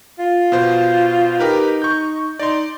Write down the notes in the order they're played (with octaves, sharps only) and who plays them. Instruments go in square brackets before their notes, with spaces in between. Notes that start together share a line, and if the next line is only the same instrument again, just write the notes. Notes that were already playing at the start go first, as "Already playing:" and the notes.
[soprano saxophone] F4
[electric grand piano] B2 C5
[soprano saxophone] D#4 [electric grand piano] G4 A#4 B4
[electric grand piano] C#6 G6
[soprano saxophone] D#4 [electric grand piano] D5 C6